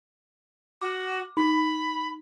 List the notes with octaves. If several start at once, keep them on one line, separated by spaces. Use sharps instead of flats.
F#4 D6
D#4 B5